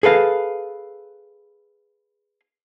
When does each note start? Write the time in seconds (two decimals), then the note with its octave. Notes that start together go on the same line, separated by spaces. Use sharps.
0.03 G#4 A4 B4 F5